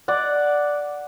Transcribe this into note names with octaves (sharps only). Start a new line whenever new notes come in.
D5 F#5